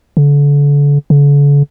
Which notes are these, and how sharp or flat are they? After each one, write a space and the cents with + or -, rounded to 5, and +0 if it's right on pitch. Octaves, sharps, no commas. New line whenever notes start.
D3 -35
D3 -45